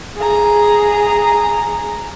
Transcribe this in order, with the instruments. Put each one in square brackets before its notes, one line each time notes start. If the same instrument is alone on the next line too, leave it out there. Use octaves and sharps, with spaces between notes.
[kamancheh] G#4 A#5